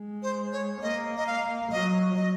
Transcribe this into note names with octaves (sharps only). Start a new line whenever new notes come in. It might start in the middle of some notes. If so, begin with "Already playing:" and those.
Already playing: G#3
C5
C#5
A#3 D#5
D#5
F5
F#3 D#5
D#5